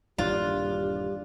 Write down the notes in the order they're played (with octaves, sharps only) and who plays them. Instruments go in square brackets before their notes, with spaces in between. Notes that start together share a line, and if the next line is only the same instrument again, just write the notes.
[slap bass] D#1 G2 E3 [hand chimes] D4 D5 F#6 [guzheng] F4 [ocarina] G4